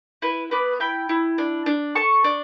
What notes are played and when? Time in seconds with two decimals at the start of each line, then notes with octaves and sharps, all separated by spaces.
0.22 E4 B4
0.51 B3 B4 D5
0.80 E4 G5 B5
1.09 E4
1.38 D4
1.66 D4
1.95 A4 A5 C#6
2.24 D4